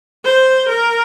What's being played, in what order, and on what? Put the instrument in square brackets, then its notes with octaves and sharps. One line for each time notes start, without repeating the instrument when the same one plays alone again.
[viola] C5
A#4